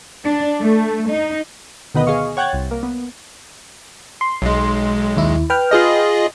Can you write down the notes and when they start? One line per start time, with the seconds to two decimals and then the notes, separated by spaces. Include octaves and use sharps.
0.24 D4
0.60 A3
1.11 D#4
1.94 D2 B2 D#3 B3 B4 D#5
2.07 G#4 D#5 F5 C#6
2.37 C#5 F#5 G5 F#6 G#6 A6
2.53 C2
2.71 A#3
2.83 B3
4.21 C6
4.42 B1 G#3
5.17 D#2 E4
5.50 B4 G5 F6
5.71 F4 G#4 D#5